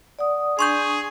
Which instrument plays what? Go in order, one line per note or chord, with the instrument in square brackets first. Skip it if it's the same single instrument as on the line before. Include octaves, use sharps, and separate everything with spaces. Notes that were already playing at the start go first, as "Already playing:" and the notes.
[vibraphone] D5 F#5 D#6
[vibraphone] D4 [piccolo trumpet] G#4 [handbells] C6 C#6 G6